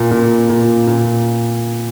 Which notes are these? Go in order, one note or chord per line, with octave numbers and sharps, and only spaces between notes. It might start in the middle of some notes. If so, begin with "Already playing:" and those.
Already playing: A#2
A#2
A#2
A#2